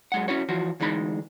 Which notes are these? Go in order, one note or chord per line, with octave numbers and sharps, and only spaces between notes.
F#2 G#3 F#5
C#4 E4 F#4 C#5
E3 F3 F#4
D2 E3 G#3 D#4 B5